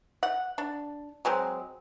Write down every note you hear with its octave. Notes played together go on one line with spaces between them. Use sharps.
F#5
D4
F#3 G#3 C4